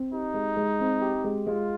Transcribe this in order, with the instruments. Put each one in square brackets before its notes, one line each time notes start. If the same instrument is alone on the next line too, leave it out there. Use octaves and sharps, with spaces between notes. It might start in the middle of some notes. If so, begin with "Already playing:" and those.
Already playing: [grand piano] C4
[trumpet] D#4 [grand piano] G4
[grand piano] G#3
G#3
C4
G4
G#3
[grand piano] G#3 [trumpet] F4